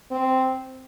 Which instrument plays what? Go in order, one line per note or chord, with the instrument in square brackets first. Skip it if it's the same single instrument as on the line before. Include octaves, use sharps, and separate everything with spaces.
[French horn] C4